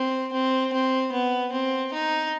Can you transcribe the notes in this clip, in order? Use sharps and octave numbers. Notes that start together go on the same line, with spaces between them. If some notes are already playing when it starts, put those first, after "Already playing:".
Already playing: C4
C4
C4
B3
C4
D#4